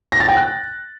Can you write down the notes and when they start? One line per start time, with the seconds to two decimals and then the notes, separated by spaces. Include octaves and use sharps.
0.12 A#6
0.20 A6
0.28 G5
0.37 F#6